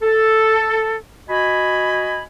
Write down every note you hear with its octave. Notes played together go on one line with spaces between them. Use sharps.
A4
F#4 D#5 G#5 B5